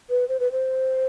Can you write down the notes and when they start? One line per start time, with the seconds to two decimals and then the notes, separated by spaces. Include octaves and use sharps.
0.10 B4
0.29 C5
0.40 B4
0.52 C5